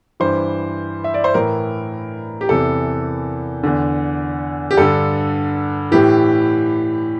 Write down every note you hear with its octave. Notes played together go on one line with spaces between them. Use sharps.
G2 E3 C5
E5
D5
C5
A2 E3 A#4
G4
E2 C3 E3 A4
E2 D3
G4
G2 D3 A4
A2 E3 G4